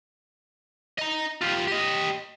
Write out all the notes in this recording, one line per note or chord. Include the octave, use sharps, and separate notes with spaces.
D#5 A#5
F4 G4
G4 D#5